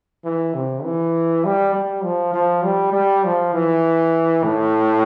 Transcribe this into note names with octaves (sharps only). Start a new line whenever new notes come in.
E3
C3
E3
G3
G3
F3
F3
G3
G3
F3
E3
A2